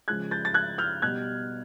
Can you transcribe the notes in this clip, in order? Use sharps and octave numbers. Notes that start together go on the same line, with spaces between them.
C#3 F3 G#3 F#6 G#6
G6 A6
A6
F#6 G#6
F6 G6
B2 G3 F#6 G#6